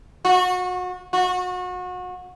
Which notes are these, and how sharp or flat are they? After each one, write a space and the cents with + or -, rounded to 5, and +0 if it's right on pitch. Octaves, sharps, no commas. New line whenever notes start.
F#4 -30
F#4 -30